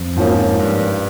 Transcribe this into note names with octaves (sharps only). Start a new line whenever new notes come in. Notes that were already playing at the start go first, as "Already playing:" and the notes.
Already playing: F2
G#2 F3 A#3 C#4 F4
G2